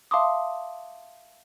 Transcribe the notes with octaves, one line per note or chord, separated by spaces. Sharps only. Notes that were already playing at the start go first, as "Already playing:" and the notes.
E5 F5 A5 C6 D6 D#6